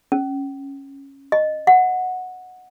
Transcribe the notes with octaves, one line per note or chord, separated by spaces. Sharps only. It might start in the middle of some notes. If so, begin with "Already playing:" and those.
C#4
D#5
F#5